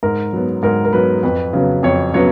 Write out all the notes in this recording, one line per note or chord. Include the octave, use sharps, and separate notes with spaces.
G#2 A#4
F#3 B3
G#2 A#4
A#4
F#3 B3 B4
F2 B4
C#3 F#3 B3
F2 C#5
C#3 F#3 B3 C#5